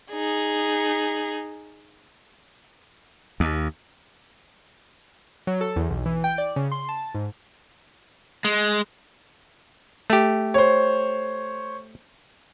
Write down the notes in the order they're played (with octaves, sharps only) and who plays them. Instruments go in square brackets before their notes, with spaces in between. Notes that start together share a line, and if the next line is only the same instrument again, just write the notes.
[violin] D#4 G#4
[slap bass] D#2
[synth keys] F#3
A4
E2
B1
E3
G5
D5
C#3
C6
A5
G#2
[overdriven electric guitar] G#3
[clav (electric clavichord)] A3 G4
[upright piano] C5 C#5